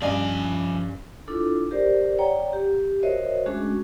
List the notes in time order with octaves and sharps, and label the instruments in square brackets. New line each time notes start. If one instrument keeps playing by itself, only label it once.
[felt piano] G2 [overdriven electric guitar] F3 G#5 [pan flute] C#4 [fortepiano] D5 D#5 F5
[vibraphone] D4 E4 F4 A4
G4 A#4 C5 D5
C#5 D5 F#5 G5 A#5
G4
F#4 A#4 C5 C#5 D#5 E5
G#3 A3 C#4 D4 F#4 G#4